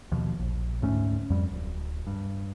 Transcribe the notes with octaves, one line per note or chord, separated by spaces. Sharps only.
D#2 B2 F3
A#1
D2 G#2 A3 C#4
F2 G3
D1
G2